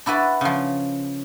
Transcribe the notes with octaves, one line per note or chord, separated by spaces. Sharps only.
D4 E4 F#4 B4 A5
C#3 F3